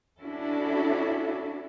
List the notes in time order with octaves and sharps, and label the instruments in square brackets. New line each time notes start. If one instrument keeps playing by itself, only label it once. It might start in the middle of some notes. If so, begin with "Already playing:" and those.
[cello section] C#4 D4 E4 F#4 A4